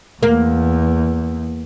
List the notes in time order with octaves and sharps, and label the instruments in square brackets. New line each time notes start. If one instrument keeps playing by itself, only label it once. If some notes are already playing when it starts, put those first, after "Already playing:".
[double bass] E2 [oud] A#3